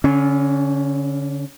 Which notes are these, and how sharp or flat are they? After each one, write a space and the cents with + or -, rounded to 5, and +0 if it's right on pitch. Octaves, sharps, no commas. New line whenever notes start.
D3 -35 C#4 +0